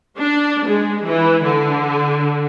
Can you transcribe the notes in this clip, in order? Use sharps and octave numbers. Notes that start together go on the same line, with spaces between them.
D4
G#3
E3
D3